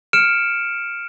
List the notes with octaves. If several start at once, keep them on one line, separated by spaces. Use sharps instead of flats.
F6 C#7 D7 E7